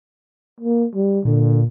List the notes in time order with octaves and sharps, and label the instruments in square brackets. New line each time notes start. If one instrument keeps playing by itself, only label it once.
[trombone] A#3
G3
[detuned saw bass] A#2 [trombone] D3